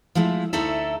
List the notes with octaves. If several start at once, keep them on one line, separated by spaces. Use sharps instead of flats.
F3 G#3 A3 E4
D2 A3 D#4 E4 A4 E5